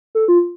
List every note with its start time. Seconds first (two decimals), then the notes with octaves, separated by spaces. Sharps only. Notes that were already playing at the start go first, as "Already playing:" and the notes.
0.15 A4
0.28 F4